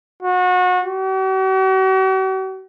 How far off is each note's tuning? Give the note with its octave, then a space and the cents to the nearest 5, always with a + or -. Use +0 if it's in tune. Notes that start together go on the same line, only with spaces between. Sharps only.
F#4 -30
F#4 +45